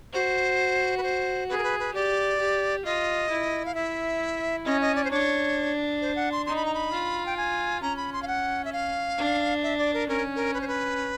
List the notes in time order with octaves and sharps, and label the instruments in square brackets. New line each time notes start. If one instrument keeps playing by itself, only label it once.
[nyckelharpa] F#4 [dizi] C5
[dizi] B4
C5
[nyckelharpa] G#4 [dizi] B4
[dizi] A#4
B4
B4
[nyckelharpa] G4 [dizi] D5
[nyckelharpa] G4
[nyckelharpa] F4 [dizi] D#5
[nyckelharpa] E4
[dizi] F5
[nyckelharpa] E4 [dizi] E5
[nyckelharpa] C#4 [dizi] D#5
[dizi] D#5
D5
C5
[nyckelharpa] D4 [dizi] C#5
[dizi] C5
F#5
C6
[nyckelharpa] D#4 [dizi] C6
[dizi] B5
A#5
B5
[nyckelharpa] F4
[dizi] G5
G#5
[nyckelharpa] C#4 [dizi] A#5
[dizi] B5
C6
F5
F#5
E5
F5
[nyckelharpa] D4
[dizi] E5
D5
A#4
[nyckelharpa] C#4 [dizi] A#4
[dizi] A#4
B4
C5
B4